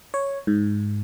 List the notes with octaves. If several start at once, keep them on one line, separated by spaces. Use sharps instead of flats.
C#5
G#2